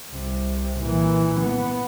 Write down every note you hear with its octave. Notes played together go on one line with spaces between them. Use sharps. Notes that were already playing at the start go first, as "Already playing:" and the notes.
C2 C3
A#2 E3
B3